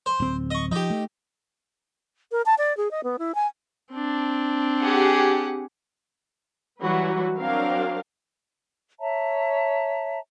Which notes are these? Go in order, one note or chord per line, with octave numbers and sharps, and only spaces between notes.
C5
D1 C4
D#5 C#6
F3 D#4 G4
A3
A#4
A5
D5
G#4
D#5
B3
E4
G#5
C4 D4
G4 G#4 F#5
E3 F#3 G3 F#4 B4
F#3 C4 D4 A#4 F5
C#5 E5 A5 A#5